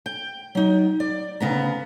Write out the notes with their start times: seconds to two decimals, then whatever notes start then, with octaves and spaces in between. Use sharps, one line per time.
0.06 G5
0.55 F#3 D#4
1.00 D5
1.40 D2 C#3 B3 A#5